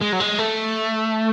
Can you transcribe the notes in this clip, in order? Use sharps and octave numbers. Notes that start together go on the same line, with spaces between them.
G#3
F#3
G#3
A3